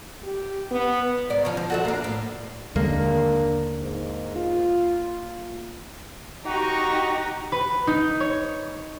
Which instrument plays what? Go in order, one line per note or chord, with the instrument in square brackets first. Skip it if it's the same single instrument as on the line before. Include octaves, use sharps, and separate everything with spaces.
[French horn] G4
B3
[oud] G#2 D5
F3 C#4
F3
F#4 A4 E5
A#3 D4
A2
[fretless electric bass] D#2 D3 G#3 [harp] A#3 [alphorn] D4
[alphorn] G#2
F4
[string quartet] D#4 G4 [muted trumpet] F#4 [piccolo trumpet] C#6
[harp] B4
D#4
C#5